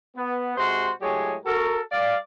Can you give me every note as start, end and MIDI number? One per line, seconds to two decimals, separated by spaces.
0.16 0.53 59
0.57 0.90 48
0.57 0.90 56
0.57 0.90 66
0.57 0.90 72
0.57 0.90 84
1.01 1.35 45
1.01 1.35 54
1.01 1.35 56
1.01 1.35 67
1.01 1.35 68
1.01 1.35 73
1.45 1.79 66
1.45 1.79 69
1.45 1.79 70
1.91 2.16 55
1.91 2.16 74
1.91 2.16 77